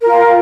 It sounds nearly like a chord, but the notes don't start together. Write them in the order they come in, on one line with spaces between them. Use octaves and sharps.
A#4 F4 G5